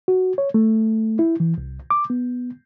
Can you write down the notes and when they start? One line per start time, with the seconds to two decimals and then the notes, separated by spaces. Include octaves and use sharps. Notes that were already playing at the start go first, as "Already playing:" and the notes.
0.08 F#4
0.38 C#5
0.54 A3
1.19 E4
1.40 E3
1.58 C2
1.90 D6
2.10 B3